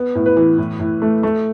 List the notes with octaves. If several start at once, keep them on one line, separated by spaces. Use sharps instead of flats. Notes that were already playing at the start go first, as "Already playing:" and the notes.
Already playing: B3
A2
B4
E3
A2
A2
A3
A3